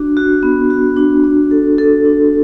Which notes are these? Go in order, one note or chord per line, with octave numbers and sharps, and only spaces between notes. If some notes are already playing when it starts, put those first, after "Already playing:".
Already playing: D4 F#4
F#4
B3
F#4
D4
D4
A4
A4
D4